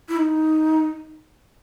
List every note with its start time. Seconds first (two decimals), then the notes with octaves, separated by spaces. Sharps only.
0.09 E4
0.17 D#4